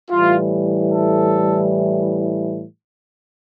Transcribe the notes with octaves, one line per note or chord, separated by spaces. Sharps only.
A2 E3 G3 F4
A4